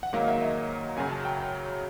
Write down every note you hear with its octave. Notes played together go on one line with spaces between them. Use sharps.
F#5
G#2 D#3 F#3 A#3 F5
E5
D#5
F#2 C#3 F#3 G#5
A5
G5